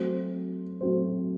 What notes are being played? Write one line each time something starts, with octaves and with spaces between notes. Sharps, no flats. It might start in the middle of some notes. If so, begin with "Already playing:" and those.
Already playing: F#3 A3 C4 F#4 C5
F#3 A3 C4 F#4 C5